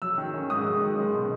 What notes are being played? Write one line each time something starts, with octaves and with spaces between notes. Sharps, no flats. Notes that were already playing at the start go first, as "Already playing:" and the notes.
F#3 E6
D#3
C#4
G#2 D#6
F#3
D#3
G#3
B2